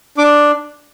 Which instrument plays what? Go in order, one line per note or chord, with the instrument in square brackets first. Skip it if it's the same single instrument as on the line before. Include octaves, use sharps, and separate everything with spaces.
[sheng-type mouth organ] D4 D6